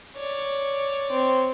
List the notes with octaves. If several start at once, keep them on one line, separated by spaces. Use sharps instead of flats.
C#5 D5
C4